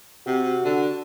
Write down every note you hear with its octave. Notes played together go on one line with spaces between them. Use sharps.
C3 F#4
D3